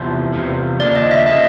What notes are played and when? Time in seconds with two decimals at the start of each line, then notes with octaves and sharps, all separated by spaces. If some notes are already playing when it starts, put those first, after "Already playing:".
Already playing: E2 C3 F3
0.33 E2 C3 F3
0.79 D#2 C#3 F3 A#3 D4 D5
0.95 D#5
1.11 E5
1.26 C#3 F3 A#3 D4 D#5